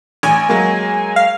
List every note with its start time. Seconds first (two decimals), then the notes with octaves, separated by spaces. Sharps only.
0.23 A1 G#5
0.49 F#3 G#3 A#3
1.16 F5